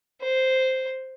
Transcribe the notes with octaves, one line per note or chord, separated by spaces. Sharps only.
C5